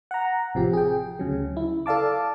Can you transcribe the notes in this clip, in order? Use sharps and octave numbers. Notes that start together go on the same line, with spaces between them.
F#5 A#5
A1 C3 F3 G4
G#4 G5
D2 C#3 F#3
E4
A4 D5 F5 A5 D6